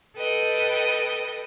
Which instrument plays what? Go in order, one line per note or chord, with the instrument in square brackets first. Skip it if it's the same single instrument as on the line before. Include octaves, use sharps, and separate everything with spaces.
[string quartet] A4 B4 D#5 G5